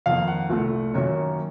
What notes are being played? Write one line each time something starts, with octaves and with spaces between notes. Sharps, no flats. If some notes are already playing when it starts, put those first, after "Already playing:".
F2 D#3 A#3 F5
F#5
C2 A#2 A3
F#2 D#3 A#3 C#4